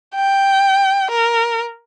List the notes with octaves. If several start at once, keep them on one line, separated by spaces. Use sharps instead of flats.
G5
A#4